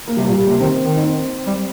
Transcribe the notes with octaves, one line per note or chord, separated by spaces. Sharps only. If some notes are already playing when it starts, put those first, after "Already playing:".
A#3
C3 G3
A#3
A#2
G3
C3 A#3
D#3 C4
D#3
D#4
C4
G3